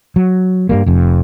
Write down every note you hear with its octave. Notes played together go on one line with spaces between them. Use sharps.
F#3
G2 G3 A#3
F1 F2